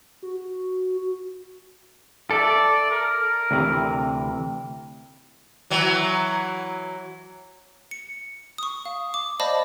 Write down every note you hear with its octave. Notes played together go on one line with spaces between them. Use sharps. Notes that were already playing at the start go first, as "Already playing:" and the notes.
F#4
A4 D5 E5
A#4
D2 C3 E3
E3 F#3
C#7
C#6 D#6
F5
D6
C5 D5 D#5 F5 A5 B5